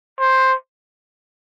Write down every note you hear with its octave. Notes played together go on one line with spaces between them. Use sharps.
C5